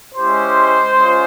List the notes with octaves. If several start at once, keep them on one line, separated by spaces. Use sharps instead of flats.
G#3 C#4 E4 G4 C5
G#3 C#4 F4